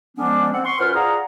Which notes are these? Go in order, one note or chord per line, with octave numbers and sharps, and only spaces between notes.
D3 F3 G#3 B3 C#4 D4
C4 F#5
C6 C#6
F#2 F4 B4 C5 F#5 F6
F4 G#4 D5 F#5 A#5